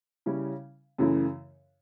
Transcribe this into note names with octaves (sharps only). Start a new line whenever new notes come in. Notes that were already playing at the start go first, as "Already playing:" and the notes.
C#3 G3 C#4 E4
F#2 C#3 E3 A3 E4